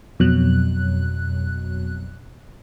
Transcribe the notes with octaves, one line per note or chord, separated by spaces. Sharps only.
F2 B2 F#3 F#6